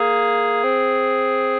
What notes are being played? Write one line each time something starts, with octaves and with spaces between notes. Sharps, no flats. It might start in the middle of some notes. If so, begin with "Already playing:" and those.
Already playing: A#3 G#4
C4